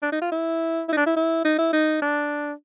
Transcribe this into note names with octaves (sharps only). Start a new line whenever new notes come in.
D4
D#4
F4
E4
E4
D#4
D4
E4
E4
D#4
E4
D#4
D4